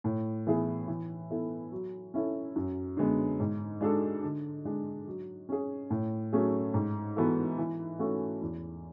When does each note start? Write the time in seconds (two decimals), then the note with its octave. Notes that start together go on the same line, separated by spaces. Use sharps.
0.04 A2
0.46 E3 B3 E4 G#4
0.87 E3
1.31 B3 E4 A4
1.72 F#3
2.14 C#4 E4 A4
2.56 F#2
2.97 D3 G#3 B3
3.40 G#2
3.81 G#3 D4 F#4 A4
4.23 D3
4.65 G#3 D4
5.07 F#3
5.49 C#4 G#4
5.90 A2
6.33 F#3 A3 C#4 G#4
6.74 G#2
7.16 E3 B3 F#4 A4
7.58 E3
7.99 A3 C#4 F#4 A4
8.42 E2